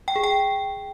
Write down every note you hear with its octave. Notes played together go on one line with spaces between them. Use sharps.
G5
G#4
G5